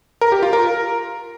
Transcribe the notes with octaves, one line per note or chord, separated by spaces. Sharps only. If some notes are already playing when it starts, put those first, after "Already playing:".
A#4
G4
F4
A#4